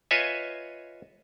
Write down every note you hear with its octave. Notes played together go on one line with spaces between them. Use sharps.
F4 B4 C#5 D#5 E5 G#5